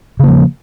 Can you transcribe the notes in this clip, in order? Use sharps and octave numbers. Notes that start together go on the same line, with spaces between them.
C#3 F3 A#3